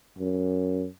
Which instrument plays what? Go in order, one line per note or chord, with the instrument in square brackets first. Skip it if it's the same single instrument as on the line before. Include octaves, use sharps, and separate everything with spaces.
[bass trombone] F#2